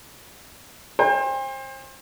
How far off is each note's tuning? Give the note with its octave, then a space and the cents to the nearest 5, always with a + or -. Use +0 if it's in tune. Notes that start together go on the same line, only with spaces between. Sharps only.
C5 +30 G5 +45